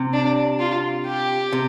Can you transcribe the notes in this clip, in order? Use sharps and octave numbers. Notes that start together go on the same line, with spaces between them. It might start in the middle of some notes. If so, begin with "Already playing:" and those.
Already playing: C3
D4
F4
G4
C3